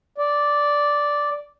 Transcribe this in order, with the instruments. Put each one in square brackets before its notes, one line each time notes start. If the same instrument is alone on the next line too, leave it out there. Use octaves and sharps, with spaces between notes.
[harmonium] D5